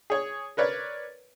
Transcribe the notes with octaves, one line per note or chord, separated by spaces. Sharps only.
G#4 C#5
A#4 B4 C#5 D5